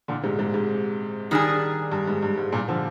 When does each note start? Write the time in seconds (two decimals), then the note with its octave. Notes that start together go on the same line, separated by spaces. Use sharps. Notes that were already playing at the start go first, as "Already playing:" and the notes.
0.08 A#2 D3
0.24 G#2 C3
0.39 G#2 C3
0.54 G#2
1.31 D#3 G3 D4 G#4
1.92 G2
2.07 G#2
2.22 G2
2.38 G#2
2.52 G2 A#2
2.68 D3 F3